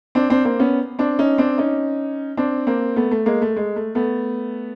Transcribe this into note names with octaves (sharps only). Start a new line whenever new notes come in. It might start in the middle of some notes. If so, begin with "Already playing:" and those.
C4 D4
C4 D4
A#3 C4
B3 C#4
C4 D4
C#4 D#4
C4 D4
C#4 D#4
C4 D4
A#3 C4
A3 B3
A3
G#3 A#3
A3
G#3
A3
A3 B3